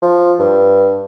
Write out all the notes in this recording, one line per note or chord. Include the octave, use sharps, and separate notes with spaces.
F3
G2